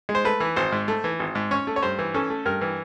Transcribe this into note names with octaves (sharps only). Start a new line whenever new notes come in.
G#3
C5
A3 B4
E3
G#1 C5
G#2
A3
E3
G#1
G#2
C#4 C#5
A3
C#5
G2 C5
E3
C#4 A4
A3
G2 A#4
E3